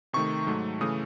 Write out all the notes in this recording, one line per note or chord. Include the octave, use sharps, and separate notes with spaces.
C3 D#3 A3 C#6
G#2 F#3 A3
C#3 E3 A3 D#6